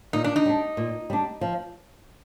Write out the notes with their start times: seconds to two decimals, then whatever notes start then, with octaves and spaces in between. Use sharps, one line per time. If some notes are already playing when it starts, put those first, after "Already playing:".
0.13 A#2 D#4
0.24 D4
0.36 D#4
0.46 G3 D4
0.77 A#2
1.10 G3 D4
1.41 F3